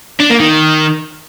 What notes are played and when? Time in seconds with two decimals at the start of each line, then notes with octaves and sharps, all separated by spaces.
0.21 D4
0.31 A#3
0.41 D#3